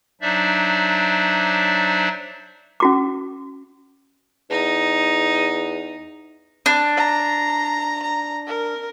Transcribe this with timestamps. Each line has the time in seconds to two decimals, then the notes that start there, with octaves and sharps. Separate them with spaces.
0.21 F#3 D4 D#4 C5 D5 E5
2.80 C#4 F#4 D6
4.50 E2 D#4
6.66 D4
6.97 A#5
8.03 A#5
8.47 A#4